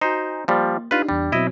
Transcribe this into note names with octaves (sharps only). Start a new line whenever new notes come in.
D#4 F#4 C5 G#5 A#5
F3 G3 A#3
D4 D#4 F4 G4 B4
E2 G3 D4
B2 F#3 C4 E4 D#5